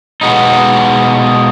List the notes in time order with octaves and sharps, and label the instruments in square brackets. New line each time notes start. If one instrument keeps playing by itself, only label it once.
[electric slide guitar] B2 G#3 B3 D#4